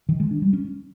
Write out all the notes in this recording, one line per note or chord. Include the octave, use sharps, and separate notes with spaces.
D#3
G#3
D4
G3
C#4